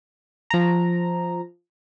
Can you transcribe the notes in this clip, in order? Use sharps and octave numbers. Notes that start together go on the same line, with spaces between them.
F3 A#5